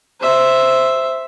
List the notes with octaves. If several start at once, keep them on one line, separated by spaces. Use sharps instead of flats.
C5 E5